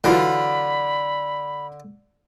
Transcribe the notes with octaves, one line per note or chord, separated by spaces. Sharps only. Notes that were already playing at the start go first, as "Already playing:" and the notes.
D3 E3 F#3 F4 B5